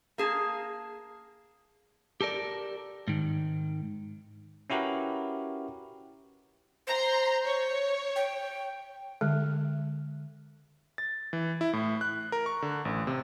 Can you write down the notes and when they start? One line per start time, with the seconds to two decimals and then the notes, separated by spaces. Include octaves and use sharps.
0.18 A#3 G#4 A5
2.21 G4 A4 A#4 D5
3.08 G#2 D#3
4.70 C#4 E4 F#4 G4 A#4 B4
6.87 C5 A#5 C6
7.44 C#5
8.16 G5
9.21 D3 G#3
10.98 A6
11.33 E3
11.61 E4
11.73 A2
12.01 F#6
12.32 A#4
12.46 C#6
12.62 D3
12.85 A1
13.07 C3